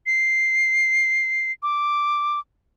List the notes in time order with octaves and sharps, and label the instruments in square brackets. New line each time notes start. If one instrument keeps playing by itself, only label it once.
[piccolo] C7
D6